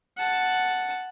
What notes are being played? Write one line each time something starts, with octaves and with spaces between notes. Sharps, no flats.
F#5 A5